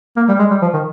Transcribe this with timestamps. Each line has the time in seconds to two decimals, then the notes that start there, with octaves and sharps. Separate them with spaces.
0.17 A#3
0.28 G3
0.39 G#3
0.51 G3
0.62 F3
0.73 D#3